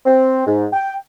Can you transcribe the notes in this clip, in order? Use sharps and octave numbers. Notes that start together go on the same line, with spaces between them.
C4
G#2
G5